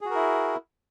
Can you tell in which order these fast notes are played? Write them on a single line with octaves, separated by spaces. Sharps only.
G#4 F#4 A#4 E4